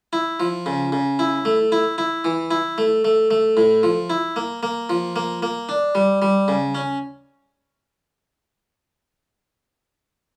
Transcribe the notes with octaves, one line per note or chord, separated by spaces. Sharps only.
E4
F3
C#3
C#3
E4
A3
E4
E4
E3
E4
A3
A3
A3
A2
F3
E4
A#3
A#3
F3
A#3
A#3
D4
G3
G3
C#3
C#4